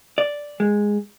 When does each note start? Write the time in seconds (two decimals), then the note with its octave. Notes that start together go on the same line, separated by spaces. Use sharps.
0.18 D5
0.60 G#3